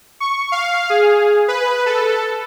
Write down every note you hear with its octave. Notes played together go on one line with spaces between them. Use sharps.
C#6
F5
G#4
B4
A4